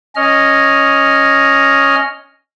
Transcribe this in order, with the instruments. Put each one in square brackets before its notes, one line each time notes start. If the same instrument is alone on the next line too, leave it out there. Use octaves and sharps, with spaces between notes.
[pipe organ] C#4 D#5 F6